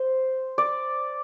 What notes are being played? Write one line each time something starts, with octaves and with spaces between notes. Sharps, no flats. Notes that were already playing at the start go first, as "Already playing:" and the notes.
Already playing: C5
D5